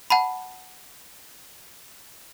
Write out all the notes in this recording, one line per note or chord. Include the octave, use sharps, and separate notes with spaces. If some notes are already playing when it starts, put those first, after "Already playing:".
F#5 A5 B5